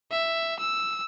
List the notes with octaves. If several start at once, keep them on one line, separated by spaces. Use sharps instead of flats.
E5
E6